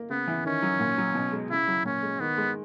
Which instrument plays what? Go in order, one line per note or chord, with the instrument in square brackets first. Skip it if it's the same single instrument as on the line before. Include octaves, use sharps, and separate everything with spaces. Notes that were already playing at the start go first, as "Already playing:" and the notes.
Already playing: [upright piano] A#3
[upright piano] C#3 [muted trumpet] B3
[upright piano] E3
[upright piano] D#3 [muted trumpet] C#4
[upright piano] F#3
A#2
F#3
B2
G#3
[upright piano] C#3 [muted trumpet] E4
[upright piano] F#3
[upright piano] A#2 [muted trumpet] C#4
[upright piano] G#3
[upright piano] D#3 [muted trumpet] B3
[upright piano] G#3